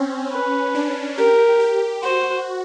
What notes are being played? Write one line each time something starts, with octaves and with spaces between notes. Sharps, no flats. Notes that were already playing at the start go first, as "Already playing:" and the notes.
Already playing: C4 C#4
B4
D4
G4 A#4
G4
F#4 C5